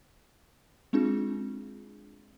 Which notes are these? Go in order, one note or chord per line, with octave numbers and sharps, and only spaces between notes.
G#3 C4 D4 F4 G#4